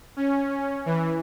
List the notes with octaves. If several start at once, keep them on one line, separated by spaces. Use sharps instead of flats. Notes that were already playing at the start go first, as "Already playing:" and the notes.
C#4
E3